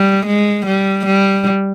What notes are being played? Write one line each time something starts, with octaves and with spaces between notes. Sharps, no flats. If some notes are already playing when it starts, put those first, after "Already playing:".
Already playing: G3
G#3
G3
G3